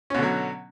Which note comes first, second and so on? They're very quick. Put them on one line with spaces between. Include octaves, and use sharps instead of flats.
C#4 B2 D3 F#3